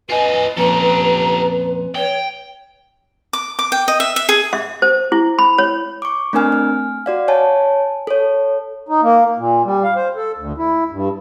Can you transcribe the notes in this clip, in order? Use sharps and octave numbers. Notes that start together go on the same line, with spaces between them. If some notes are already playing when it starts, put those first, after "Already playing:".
F4 B4 D#5 G#5
F2 A#2 C#4 G4 A4 A#5
C#5 G5
D6
D6
G5
D#5
E5
E5
G#4
E5
C5
E4
B5
C#5
C#6 D6
A3 C4 D4 A#4 G#5 F6
F6
F#4 D5 F5
C#5 G#5 A5
A4 C#5
D#4
A#3
A#2
G3
F5
C5
A4
D2
E4
G2